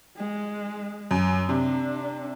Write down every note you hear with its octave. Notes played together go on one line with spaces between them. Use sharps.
G#3
F#2
C3 D4